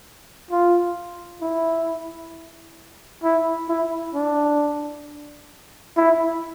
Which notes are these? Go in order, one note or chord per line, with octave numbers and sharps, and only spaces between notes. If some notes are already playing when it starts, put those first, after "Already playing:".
F4
E4
E4
E4
D4
E4